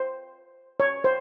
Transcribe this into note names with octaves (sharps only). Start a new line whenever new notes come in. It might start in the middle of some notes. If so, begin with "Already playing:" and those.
Already playing: C5
C#5
C5